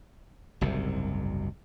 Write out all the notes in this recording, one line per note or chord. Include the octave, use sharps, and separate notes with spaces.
F#1 C2 G#2 C3